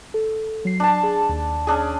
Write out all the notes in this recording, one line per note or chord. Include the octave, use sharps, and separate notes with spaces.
A4
F#3 C7
D4 A5
G#4
D#2
C#4 D4 G#4